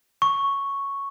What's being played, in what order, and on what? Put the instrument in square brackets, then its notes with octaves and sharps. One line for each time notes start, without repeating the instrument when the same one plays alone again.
[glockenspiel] C#6